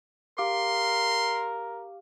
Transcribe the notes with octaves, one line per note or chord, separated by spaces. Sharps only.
G4 A#4 F5 C6 D6